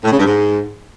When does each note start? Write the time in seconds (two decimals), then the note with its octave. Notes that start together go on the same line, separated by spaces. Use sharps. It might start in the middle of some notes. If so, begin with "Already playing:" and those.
0.04 A2
0.11 C#3
0.19 G2
0.26 G#2